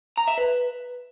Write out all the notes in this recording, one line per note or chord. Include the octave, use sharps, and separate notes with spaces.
A#5
E5
B4